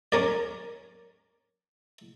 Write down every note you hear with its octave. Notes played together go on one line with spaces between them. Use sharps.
C#4 A#4 D5